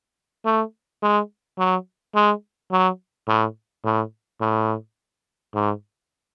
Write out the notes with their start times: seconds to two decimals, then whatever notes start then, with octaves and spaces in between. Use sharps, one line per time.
0.45 A3
1.03 G#3
1.59 F#3
2.15 G#3
2.72 F#3
3.28 A2
3.85 A2
4.41 A2
5.54 G#2